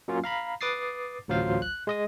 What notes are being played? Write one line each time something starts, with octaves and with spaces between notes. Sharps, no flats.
F#3 A#3 C#4 F4
F5 A#5 B5
B4 D6 D#6 A6 C7
A1 D2 F#3 F4 C5 F5
F#6
G#3 D#5 D#6